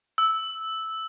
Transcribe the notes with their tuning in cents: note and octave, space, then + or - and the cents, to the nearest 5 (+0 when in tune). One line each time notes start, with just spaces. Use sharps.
E6 -10